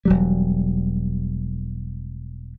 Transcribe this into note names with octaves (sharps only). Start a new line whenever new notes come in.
E1 F#3 G3